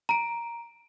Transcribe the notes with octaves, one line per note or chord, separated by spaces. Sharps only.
A#5 D7